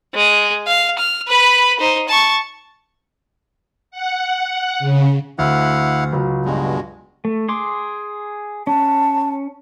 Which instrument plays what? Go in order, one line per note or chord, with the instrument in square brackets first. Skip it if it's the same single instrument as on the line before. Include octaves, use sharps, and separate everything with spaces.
[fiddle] G#3
F5
F6
B4 B5
D#4 C5
A5 C#6
[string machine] F#5
C#3
[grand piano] D2 [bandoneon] E4 F5 F#5
[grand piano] C#2 F#3
[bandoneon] G2 B2 G#3
[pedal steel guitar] A3
G#4 C6 D6
[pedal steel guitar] C#4 [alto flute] A5